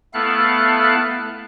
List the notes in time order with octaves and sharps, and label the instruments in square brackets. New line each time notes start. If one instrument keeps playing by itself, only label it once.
[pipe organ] A3 B3 E4 A4 F5 F#6